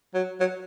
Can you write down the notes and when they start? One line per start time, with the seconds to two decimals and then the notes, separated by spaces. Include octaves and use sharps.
0.14 F#3
0.40 F#3